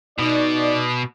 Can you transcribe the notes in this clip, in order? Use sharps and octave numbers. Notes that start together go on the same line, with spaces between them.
B2 D#4 D5